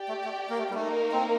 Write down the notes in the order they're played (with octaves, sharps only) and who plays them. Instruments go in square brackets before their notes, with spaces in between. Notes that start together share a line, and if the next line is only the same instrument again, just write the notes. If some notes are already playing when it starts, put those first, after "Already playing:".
Already playing: [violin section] G4 D5 G5
[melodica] A3
A3
A#3
A3
G3
[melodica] A3 [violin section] A#3 D#4 A#4
[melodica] C4